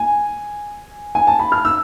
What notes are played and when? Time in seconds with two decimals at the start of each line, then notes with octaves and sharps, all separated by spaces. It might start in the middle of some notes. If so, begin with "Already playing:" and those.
Already playing: G#5
1.15 G#5
1.27 A5
1.39 B5
1.52 F6
1.65 E6